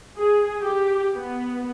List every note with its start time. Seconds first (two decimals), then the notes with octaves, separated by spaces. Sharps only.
0.17 G#4
0.62 G4
1.15 B3